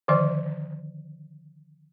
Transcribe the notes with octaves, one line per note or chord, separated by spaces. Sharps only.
D3 D#3 F3 C5 D5